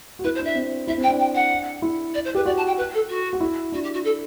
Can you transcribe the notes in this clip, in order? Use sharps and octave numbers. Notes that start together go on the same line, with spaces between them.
F#4
E4 B4
C5
D4 E5
C4
E4 E5
C4
G5
D4
G5
F#5
E4
D5
C5
G4 B4
F#4 D5
A5
G5
B4
A4
F#4
F#4
E4
D4 F#4
G4
F#4
A4